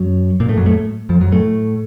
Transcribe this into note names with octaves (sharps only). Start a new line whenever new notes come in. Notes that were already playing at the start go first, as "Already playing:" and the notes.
Already playing: F#2 F#3
A#2 A#3
A2 A3
F#2 F#3
A2 A3
F2 F3
F#2 F#3
A2 A3